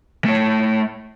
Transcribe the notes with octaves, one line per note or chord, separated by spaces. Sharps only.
A3 C#5